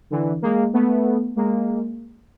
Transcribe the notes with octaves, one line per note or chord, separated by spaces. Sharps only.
D3 E3
G#3 A#3
A3 B3
G#3 A#3